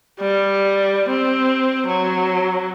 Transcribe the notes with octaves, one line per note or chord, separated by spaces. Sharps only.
G3
C4
F#3